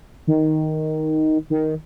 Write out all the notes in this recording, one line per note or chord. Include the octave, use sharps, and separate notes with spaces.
D#3
D#3